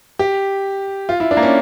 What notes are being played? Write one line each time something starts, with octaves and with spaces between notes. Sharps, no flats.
G4
F4
E4
D4
A#3
C#4